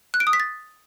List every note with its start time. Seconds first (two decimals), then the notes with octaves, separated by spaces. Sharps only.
0.14 F#6
0.20 D7
0.27 D#6
0.33 B6
0.40 A6